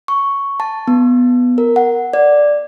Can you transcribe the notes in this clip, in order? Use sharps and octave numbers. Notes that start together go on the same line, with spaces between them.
C#6
A5
B3
A#4
F#5
D5